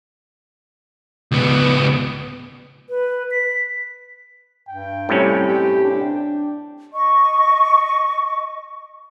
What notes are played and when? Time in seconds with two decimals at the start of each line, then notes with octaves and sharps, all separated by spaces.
1.31 C#2 B3
2.90 B4
3.31 B6
4.68 G2 G5
5.09 A2 C3 G3 C#4
5.48 G4
5.84 D4
6.93 D#5 C#6